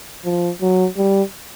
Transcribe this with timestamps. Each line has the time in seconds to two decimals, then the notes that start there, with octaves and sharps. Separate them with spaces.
0.25 F3
0.62 F#3
0.97 G3